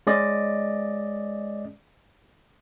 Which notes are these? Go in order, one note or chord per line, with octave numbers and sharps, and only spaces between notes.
G#3 C#4 D5 D#5